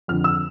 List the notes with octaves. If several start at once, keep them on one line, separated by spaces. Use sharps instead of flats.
F2 D3 F3 F6
E6